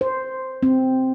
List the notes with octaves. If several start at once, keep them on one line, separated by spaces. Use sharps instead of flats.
C5
C4